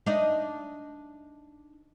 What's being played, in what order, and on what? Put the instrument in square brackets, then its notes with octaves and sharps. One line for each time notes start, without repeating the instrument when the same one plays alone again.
[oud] D4 D#4 D#5